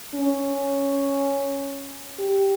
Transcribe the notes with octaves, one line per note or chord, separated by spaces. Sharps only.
C#4
G4